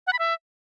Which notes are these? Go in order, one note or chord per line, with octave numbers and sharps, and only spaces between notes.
F#5
B5
E5